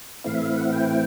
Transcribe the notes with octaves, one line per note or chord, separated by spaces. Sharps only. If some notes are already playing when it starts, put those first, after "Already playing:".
A2 E3 A3 C4 E4 F5
E5
F5
F#5
G5